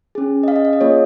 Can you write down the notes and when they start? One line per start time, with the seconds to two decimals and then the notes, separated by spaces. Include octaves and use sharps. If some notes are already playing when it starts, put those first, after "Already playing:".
0.15 C#4 G#4
0.43 D#5
0.48 F5
0.56 D#5
0.65 F5
0.73 D#5
0.81 A#3 F4 G#4 C#5